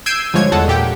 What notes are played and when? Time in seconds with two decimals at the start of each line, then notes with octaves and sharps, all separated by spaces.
0.06 E6 G6 G#6 C7 D7 D#7
0.34 G2 D3 F3 G#3 C#5 G#6
0.52 E2 G#3 A4 F#5 A5
0.68 A#2 G4 G5